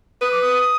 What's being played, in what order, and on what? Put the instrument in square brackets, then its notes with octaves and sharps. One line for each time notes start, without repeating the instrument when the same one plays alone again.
[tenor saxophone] B4 [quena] D#6
[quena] D6
D#6